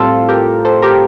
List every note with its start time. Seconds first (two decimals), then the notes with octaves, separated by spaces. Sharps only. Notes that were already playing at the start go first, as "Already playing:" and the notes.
Already playing: A2 G3 C4 F4 A4
0.29 G4 A#4
0.65 A4 C5
0.82 G4 A#4